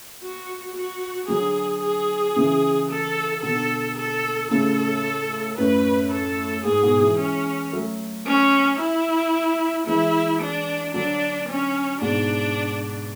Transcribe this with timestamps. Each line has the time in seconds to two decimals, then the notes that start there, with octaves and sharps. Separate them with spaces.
0.21 F#4
0.75 F#4
1.28 D3 F#3 G#4
1.83 G#4
2.36 C#3 E3
2.90 A4
3.43 B2 D3 A4
3.97 A4
4.50 A2 C#3 A4
5.57 F#2 A2 B4
6.12 A4
6.65 G#2 G#4
6.83 G#2 B2
7.01 E3 G#3
7.19 C#4
7.72 F#3 A3
8.26 C#4
8.80 E4
9.87 E3 G#3 E4
10.41 D4
10.94 D3 F#3 D4
11.48 C#4
12.01 G#2 B2 D4